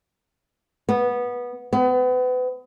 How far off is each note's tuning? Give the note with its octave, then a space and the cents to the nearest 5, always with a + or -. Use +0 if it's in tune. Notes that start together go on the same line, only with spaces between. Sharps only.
B3 -15
B3 +35